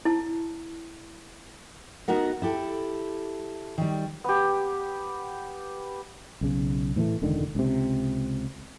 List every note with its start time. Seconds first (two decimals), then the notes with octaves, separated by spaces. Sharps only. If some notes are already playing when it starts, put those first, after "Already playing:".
0.05 E4 A5
2.08 B3 D#4 F#4 A#4 F#5
2.42 E4 G4 A4
3.78 D#3 G3
4.24 B3 G4
6.41 B1 C#3
6.96 A2 E3 G3 A3
7.22 E1 C#2 D3 D#3
7.55 C#2 C3